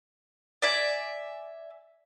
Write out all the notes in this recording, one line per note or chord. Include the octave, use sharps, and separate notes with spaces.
D5 E5 G#5